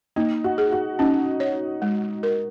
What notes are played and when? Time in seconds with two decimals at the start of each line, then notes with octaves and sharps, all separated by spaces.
0.16 A#3 D#4
0.44 F#4
0.58 G#4
0.72 F#4
0.99 C#4 D#4
1.40 C#5
1.82 G#3
2.23 A#4